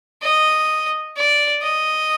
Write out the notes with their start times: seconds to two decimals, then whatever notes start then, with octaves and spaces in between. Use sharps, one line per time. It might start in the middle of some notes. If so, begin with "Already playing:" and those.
0.23 D#5
1.17 D5
1.62 D#5